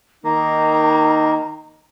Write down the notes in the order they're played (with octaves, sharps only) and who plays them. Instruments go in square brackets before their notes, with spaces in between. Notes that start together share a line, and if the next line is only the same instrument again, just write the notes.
[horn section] D#3 A#3 D#4 [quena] A#5